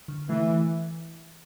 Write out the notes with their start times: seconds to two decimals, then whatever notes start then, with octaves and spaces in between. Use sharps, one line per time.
0.08 D3
0.29 E3 A3